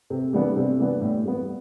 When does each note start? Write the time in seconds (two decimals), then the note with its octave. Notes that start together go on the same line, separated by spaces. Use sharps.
0.10 C3
0.33 E3 G3 B3 D4
0.56 C3
0.80 E3 G3 B3 D4
1.01 A2
1.25 G3 B3